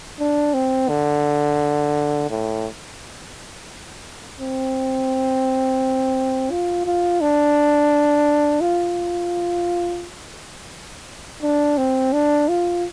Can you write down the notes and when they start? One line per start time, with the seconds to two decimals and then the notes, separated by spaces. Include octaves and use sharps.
0.19 D4
0.54 C4
0.89 D3
2.30 A2
4.40 C4
6.51 F4
6.86 F4
7.21 D4
8.61 F4
11.43 D4
11.78 C4
12.13 D4
12.49 F4